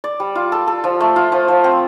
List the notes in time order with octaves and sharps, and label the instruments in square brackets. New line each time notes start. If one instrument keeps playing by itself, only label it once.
[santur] D5
G3
F4
A4
A4
F3
A3
F4
F3
F3
C4